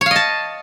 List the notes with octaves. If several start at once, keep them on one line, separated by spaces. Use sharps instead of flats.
C#5 D#5 F5 A5